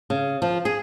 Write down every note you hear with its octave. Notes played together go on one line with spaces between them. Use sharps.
C#3
F3
G#4